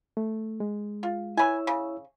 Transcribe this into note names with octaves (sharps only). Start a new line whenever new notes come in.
A3
G#3
F4
E4 B4 C#5 G#5 E6
C#3